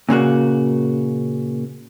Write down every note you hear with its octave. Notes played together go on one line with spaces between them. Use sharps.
A#2 C#3 A#3 F#4